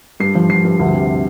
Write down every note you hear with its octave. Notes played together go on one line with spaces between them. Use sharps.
G2 C7
F3
F3 C7
G2
D2
C3